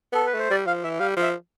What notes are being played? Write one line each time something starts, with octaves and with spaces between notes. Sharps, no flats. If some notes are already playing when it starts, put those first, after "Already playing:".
B3 A4
B4
A3 C5
G3 D5
F3 F5
E3 E5
G3 F5
F3
E5